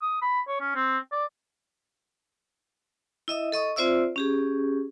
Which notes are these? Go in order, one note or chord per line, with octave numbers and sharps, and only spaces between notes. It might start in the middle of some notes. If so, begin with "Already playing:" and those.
D#6
B5
C#5
C#4
C4
D5
E4 D#5 E5 D#6
A4 D#5 C#6 D#6
C4 F4 C5 D5 E5 E6
C#4 G4 G#4